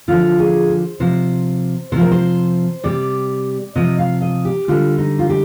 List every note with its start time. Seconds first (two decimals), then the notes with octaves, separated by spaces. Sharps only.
0.08 D3 F3 F4
0.39 G#4
0.69 C5
1.00 C3 F3 C5
1.92 C3 F3 C5
2.01 A#4
2.11 C5
2.84 C3 G3 D5
3.75 C3 F3 D#5
3.99 F5
4.22 D#5
4.45 G4
4.68 D3 G3 F4
4.98 D#4
5.19 F4
5.30 G4